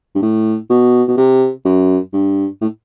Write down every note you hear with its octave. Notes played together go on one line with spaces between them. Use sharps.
G2
A2
B2
B2
C3
F#2
G2
A2